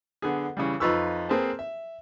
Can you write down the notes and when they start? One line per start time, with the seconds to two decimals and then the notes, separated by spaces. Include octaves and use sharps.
0.22 D3 B3 G#4
0.57 C#3 E3 G3
0.80 F2 D#4 F4 B4 C#6 E6
1.29 A#3 C4 G#4 B4 C5 A5
1.59 E5